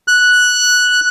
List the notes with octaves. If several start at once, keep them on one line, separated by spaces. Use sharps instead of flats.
F#6